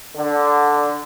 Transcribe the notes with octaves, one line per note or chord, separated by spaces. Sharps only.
D3